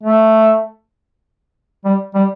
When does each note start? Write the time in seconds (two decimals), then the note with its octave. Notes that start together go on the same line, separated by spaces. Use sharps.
0.03 A3
1.85 G3
2.15 G3